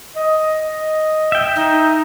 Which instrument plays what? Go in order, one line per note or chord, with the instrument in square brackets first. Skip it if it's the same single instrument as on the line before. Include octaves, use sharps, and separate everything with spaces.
[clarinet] D#5
[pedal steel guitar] E5 G5
[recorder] D#4